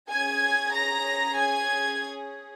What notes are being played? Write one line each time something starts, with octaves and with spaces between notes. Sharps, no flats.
C#4 G#4 G#5 G#6
A#5 A#6
G#5 G#6